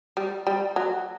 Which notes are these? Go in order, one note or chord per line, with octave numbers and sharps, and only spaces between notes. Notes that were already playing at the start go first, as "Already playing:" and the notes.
G3
G3
F#3